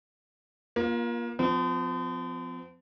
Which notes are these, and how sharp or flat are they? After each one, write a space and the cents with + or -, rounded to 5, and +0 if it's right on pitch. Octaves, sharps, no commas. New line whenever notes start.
A#3 +30 F4 +0
F3 +10 C4 -45